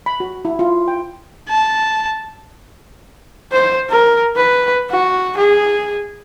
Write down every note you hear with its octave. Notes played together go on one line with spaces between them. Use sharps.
B5
F#4
E4
F4
G5
A5
C5
A#4
B4
F#4
G#4